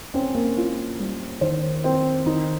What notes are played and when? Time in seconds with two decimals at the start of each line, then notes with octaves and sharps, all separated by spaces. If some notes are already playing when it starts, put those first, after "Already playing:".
0.14 C4 C#4
0.35 A#3
0.57 F4
0.99 G3
1.41 D#3 C5
1.84 C4
2.26 D#3 D#4